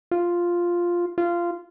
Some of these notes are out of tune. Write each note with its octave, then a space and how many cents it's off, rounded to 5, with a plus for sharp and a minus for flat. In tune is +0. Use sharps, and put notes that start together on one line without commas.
F4 +0
F4 -15